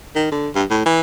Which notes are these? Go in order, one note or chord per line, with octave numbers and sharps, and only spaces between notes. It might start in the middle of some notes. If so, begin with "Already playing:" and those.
D#3
D3
G2
A2
E3